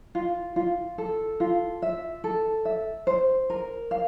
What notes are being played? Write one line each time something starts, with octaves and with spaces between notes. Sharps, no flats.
F4
F4
A4
F4
E5
A4
E5
C5
A#4
F5